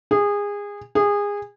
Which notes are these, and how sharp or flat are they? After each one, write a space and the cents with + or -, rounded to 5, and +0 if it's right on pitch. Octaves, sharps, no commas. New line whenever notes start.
G#4 -25
G#4 -25